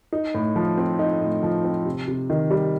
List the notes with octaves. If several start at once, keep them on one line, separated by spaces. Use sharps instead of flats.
D#4
A2
F3
C4
D#4
A2
F3
C4
C3
C3
D#3
G3